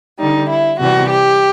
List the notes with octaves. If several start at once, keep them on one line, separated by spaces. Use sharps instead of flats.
D3 G3 D#4
E4
C3 E3 G3 F#4
G4